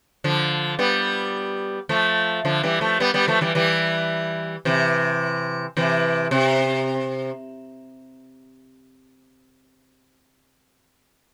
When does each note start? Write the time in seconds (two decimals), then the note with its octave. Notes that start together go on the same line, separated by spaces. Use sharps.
0.24 D3 F3
0.79 G3 B3
1.89 F3 A3
2.45 D3 F3
2.63 E3 G3
2.81 F3 A3
3.00 G3 B3
3.14 G3 B3
3.28 F3 A3
3.41 E3 G3
3.55 E3 G3
4.65 C3 E3
5.77 C3 E3
6.31 C3